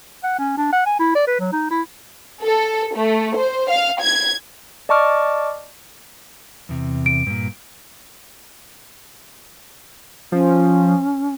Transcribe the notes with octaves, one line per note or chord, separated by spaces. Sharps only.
F#5
C#4
D4
F#5
G#5
E4
D5
B4
F#3
D#4
E4
A4
A3
C5
F5
G#6
D5 D#5 A5 C#6 D6 F6
E2 C3
D7
G2 A#2
F3 C#4